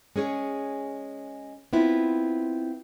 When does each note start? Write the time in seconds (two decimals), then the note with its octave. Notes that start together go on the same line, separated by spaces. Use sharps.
0.16 G#3 C#4 G#4 C#5
1.73 B3 C4 E4 F4